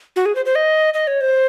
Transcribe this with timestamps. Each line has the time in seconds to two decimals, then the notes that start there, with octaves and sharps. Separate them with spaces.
0.16 F#4
0.26 G#4
0.35 C5
0.45 C5
0.55 D#5
0.94 D#5
1.07 C#5
1.21 C5